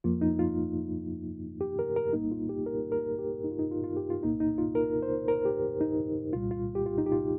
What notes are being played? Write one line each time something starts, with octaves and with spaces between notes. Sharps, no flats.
F2 F3 A#3 F4
D#4
F4
G4
A#4
A#4
C2 A#2 G3 A#3 D#4
F4
G4
A#4
A#4
G4
D#4
F4
D#4
F4
F4
G4
F4
C2 A#2 A#3 D#4
D#4
F4
A#4
C5
A#4
G4
D#4
C2 A#2 G3 F4
F4
G4
F4
D#4
G4
F4